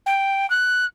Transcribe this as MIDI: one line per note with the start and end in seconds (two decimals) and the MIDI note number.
0.06 0.49 79
0.50 0.85 90